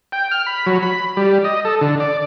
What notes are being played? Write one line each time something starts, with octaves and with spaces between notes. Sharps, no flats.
G5
F6
B5
F#3
B5
G3
D#5
A4
D3
D5